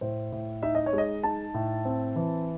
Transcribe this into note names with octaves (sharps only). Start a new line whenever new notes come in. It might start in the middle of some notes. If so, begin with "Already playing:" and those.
A2 C5
A2
D#4 E5
D#5
C#5
G#3
D#5
D#4 A5
A2
C4
E3